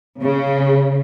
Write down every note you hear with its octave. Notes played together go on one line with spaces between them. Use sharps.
C#3